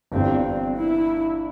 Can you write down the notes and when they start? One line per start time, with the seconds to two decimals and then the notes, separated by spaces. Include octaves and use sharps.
0.12 G1 G2 E3 G3 C4
0.45 C4
0.77 E4